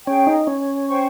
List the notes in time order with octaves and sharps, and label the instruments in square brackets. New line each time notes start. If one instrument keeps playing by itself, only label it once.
[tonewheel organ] C#4 [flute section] G#4 C#5 G5
[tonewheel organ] D#4
C#4
[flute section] C5 G5 C#6